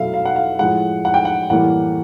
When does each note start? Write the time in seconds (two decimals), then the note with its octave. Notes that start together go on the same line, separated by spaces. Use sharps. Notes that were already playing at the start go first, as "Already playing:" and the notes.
Already playing: B2 F#3 A3 E5 F5
0.14 F5
0.25 F#5
0.36 F5
0.59 A2 F3 G#3 F#5
1.05 F#5
1.14 G5
1.25 F#5
1.50 A2 E3 G3 A#3 F#5